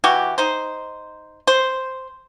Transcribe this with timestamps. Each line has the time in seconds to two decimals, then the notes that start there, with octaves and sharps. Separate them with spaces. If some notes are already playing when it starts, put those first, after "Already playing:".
0.04 E3 F#4 G4
0.38 D#4 C5
1.47 C5